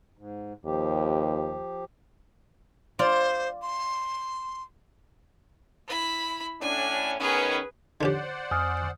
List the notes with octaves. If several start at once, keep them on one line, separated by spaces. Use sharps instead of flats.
G#2
D#2 F3 G4
F4 C5 D5
C6
E4 B5
A2 C#4 D4 G#5
D#3 B3 C#4 G#4 B4
D3 C#4 G4 C5 D5 F#5
F2 G#5 D#6 F6